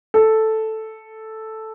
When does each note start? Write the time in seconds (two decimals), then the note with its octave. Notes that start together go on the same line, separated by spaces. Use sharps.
0.14 A4